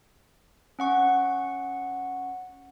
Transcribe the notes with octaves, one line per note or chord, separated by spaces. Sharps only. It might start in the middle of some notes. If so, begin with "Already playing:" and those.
C#4 F#5 C#6